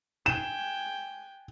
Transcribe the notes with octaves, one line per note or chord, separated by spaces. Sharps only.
G5 G#5 E7